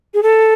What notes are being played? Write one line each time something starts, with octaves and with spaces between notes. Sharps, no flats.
G#4
A4